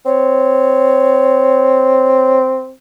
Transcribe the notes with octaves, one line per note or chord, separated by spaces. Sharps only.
C4 C#5